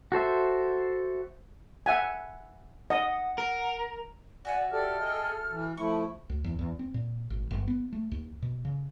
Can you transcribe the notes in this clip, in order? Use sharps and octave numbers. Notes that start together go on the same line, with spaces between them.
F#4 A4 C5 E5
E5 F#5 G#5
D#5 F#5
A#4
F#4 D5 E5 F#5 G#5
G4 A4 D5 F6
G#4 D#5 G5
E3
F3 A3 E4 C#6
D2
E2
E2
C4
A#2
G#1
G1
B3
A3
D#2
B2
C#3